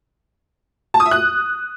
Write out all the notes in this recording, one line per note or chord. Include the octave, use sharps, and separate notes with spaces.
A5
D#6
E5
F#6